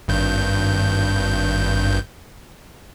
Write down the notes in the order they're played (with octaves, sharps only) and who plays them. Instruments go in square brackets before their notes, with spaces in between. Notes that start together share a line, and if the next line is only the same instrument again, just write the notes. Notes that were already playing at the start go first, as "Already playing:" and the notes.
[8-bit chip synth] G#1 G2 G6